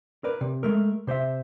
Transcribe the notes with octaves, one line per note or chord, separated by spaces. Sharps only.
A#4 B4 D5
C3
G#3 A3 A#4
C3 C5 D5 E5